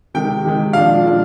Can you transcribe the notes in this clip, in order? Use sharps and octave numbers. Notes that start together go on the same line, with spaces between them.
C3 D#3 G#3 G5
C3 D#3 G#3
A#2 F3 G#3 D4 F5
A#2 F3 G#3 D4